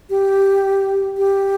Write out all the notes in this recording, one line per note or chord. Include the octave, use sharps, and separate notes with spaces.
G4
G4